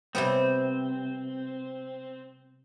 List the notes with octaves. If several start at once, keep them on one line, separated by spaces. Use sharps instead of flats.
C3 G3 B3 C4